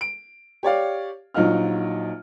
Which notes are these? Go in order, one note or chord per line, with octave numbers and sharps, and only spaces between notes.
D7
G4 C#5 D5 F5
A#1 F#3 D#4 F4 D#5 F6